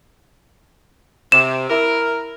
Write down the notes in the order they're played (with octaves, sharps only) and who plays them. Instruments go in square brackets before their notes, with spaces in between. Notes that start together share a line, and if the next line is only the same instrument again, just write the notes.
[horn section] C3 [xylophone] E7
[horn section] E4 A#4